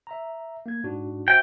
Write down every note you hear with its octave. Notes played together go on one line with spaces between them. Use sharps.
E5 A#5
A#3 G#6
G#2 D4 F#4
F#4 C5 E5 G5